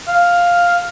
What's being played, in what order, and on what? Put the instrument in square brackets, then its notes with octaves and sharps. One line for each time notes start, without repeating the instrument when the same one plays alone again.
[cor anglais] F5